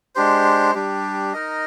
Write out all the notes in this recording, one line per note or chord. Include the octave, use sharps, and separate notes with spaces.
G#3 D4 G4 C5
G3 D4 G4
D#4 A#4 D#5